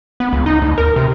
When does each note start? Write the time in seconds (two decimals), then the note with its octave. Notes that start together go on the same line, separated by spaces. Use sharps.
0.20 B3
0.33 C#2
0.46 D#4
0.62 D2
0.78 A#4
0.96 C3